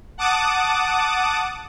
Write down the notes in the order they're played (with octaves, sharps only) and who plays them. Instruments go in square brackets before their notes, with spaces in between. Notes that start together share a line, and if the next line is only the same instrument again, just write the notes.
[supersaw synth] F#5 A5 D6 D#6